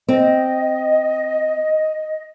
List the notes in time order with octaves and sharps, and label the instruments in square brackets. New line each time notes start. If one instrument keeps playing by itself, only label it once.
[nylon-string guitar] C4 [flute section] D#5